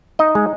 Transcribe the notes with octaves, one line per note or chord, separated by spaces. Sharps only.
D#4 D#5
G#3